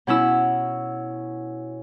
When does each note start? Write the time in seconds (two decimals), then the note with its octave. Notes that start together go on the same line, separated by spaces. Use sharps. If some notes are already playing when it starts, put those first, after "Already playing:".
0.07 B2 C#4 E4 E6